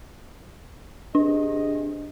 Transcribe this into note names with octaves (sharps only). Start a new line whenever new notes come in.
C3 D4 G#4 D#5